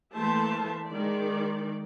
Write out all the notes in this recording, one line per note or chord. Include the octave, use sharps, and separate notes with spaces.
E3 A3 A#3 C5 E5 A5
D#3 G#3 D5